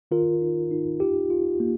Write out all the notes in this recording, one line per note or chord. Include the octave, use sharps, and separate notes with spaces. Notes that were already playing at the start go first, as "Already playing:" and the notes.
D#3 F4 A#4
D#4
D#4
F4 G4
F4
A#3